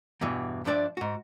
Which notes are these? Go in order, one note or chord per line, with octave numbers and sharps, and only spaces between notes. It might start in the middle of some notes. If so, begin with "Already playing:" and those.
E2 G2 B2 E3
G2 F3 D4 D5 E5
G#2 F#4